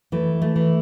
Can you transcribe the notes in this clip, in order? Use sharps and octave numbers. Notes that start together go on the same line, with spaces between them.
E3 A3
A3
E3